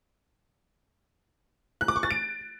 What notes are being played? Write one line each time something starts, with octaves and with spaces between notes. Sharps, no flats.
F#6
D6
C#6
A6
D7